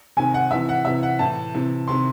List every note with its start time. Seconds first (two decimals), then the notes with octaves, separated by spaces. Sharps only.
0.17 C3 D#3 G#5
0.34 F#5
0.51 C3 E3 E5
0.69 F#5
0.85 C3 E3 E5
1.03 F#5
1.19 A2 E3 A5
1.54 C3 E3
1.88 C3 D#3 C6